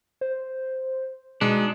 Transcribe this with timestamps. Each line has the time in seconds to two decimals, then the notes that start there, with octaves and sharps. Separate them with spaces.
0.21 C5
1.41 B2 G#3 D4 D#4